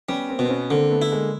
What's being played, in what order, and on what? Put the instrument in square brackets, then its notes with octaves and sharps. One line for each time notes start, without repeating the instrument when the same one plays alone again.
[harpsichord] G3 [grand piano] B3 C#4
[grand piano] A#3 C4
[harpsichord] B2
[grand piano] C4
B3 C#4
[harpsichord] D3 [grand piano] A#3 C4
[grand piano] A3 B3
[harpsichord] E4
[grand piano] G#3 A#3